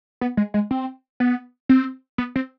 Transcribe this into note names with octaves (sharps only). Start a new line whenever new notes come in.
B3
G#3
G#3
C4
B3
C4
B3
C4